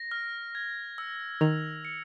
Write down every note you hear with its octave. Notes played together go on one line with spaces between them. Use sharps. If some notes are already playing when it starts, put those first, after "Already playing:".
Already playing: A#6
F6
G#6
E6
D#3 F7
C#7